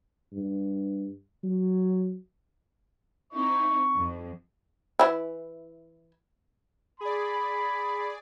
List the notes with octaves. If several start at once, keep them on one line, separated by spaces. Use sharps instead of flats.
G2
F#3
C4 D#4 E4 C#6
F2
E3 E4
G#4 D5 B5